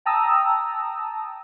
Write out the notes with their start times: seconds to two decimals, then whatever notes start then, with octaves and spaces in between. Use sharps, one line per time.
0.06 G5 A5 A#5 D#6 E6